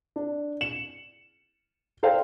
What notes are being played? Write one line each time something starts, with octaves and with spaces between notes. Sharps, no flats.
D4
C#7 E7 F#7
A4 C5 D5 F5 G5